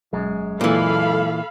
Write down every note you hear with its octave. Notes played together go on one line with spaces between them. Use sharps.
E1 F#2 G#3
A#2 E3 A4 F5 B5